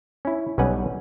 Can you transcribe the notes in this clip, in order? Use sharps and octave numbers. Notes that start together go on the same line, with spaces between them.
C#4 E4
B1 G3 C#4 B4 F#5 G#5